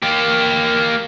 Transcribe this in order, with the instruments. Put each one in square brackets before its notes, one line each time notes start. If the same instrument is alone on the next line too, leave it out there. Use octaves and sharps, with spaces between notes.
[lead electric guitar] A#3 G4